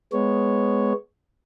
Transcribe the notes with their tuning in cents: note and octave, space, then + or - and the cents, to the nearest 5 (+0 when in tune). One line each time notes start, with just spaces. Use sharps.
G#3 +0 B3 +10 C#5 +0